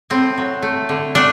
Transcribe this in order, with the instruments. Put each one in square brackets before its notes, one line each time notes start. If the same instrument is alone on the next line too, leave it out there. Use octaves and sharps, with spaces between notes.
[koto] A2 C4
F#3
A3
D3
A3 D4